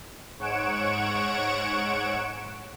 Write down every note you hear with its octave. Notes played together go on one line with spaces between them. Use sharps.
G#2 C#5 F#5 C#6 D7 E7